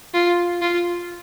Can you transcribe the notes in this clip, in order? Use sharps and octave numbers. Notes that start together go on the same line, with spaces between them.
F4
F4